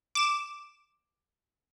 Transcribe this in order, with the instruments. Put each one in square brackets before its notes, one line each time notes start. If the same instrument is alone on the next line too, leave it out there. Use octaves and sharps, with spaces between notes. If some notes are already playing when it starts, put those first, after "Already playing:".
[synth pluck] D6 E7